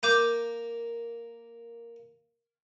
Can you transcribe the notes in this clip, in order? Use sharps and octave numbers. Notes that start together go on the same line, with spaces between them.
A#3 D6 G6 D#7